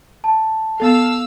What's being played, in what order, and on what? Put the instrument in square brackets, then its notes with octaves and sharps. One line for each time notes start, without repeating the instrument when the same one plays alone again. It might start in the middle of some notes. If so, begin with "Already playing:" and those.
[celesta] A5
[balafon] B3 A4 [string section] F5 E6